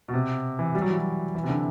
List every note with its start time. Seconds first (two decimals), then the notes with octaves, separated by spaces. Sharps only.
0.08 B2
0.13 C3
0.59 E3
0.75 G3
0.82 F#3
0.89 E3
0.97 F#3
1.35 E3
1.43 C3
1.49 D3